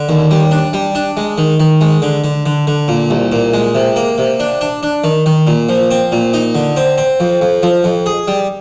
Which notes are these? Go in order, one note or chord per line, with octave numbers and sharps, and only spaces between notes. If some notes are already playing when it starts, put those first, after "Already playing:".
Already playing: D3
D#2
G3
D4
G3
D4
G#3
D#3
D#3
G#3
D3
D3
D3
D3
A#2
C2
A#2
G#3
C3
A#3
C3
D4
D4
D4
D#3
D#3
A#2
F3
C4
A#2
D#4
D3
C4
C4
F2
F2
F3
F2
G#4
G3